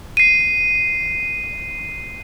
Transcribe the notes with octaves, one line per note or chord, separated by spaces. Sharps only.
C7 D#7